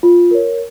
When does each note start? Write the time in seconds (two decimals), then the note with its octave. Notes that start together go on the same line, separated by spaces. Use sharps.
0.03 F4
0.31 A#4 C#5